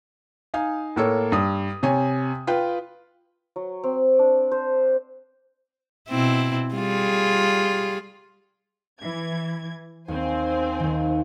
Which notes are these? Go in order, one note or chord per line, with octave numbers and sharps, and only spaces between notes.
D#4 F5 G#5
A2 A#3 A4 C#5
G2 D#6
C3 C#5 G#5
F4 B4 G5
F#3
C4
D4
C5
B2 C4 E4
G3 F4 G#4
E3 G#6
D#2 C4 C5 G#5
D#2 D#3